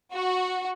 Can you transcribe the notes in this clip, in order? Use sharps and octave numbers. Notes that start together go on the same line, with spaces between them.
F#4